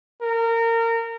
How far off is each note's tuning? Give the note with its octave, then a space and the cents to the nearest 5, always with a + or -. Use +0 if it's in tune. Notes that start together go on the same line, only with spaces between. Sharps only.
A#4 -25